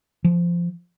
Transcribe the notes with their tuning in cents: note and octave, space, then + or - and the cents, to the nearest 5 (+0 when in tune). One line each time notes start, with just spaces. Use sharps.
F3 -15